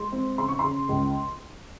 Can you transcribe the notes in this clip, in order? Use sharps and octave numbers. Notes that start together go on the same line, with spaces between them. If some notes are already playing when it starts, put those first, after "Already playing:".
Already playing: G#3 C6
C4
C#3 C6
C#6
C#3 C6
C#2